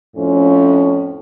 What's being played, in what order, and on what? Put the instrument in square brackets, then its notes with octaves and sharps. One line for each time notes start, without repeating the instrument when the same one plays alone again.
[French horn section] F2 A2 F3 C#4